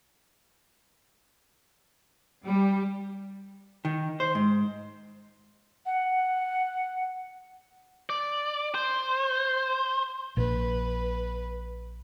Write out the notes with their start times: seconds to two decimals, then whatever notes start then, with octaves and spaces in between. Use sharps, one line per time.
2.42 G3
3.85 D#3
4.20 C5
4.35 G#2
5.86 F#5
8.10 D5
8.75 C5
10.37 A#1 B4